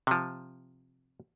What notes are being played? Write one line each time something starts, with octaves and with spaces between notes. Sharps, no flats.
C3 F3